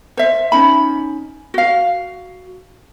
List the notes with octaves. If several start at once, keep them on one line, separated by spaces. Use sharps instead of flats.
C5 E5
C#4 D#4 B5
F#4 F5